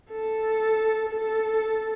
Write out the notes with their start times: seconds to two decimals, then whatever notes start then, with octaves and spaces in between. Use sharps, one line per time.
0.11 A4
1.10 A4